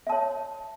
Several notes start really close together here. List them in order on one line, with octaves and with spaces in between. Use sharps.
E5 A5 C#5